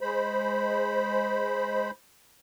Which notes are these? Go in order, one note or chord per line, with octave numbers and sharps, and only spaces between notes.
G#3 C5 B5